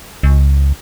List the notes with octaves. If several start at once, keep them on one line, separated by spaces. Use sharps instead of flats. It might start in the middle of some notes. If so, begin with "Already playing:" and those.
C#2